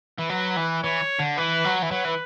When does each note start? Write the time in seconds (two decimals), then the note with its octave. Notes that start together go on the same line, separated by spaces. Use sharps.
0.19 E3
0.29 F#3 B4
0.57 E3
0.84 E3 C#5
1.19 D3
1.37 E3 B4
1.64 F#3
1.82 E3
1.91 F#3 B4
2.05 E3